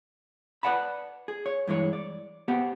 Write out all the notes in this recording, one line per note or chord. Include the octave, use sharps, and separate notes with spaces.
B4 D5 F#5 A5 B5
G#4
C#5
G2 E3 G#3 C#5
D5
B3 G4 C5 F#5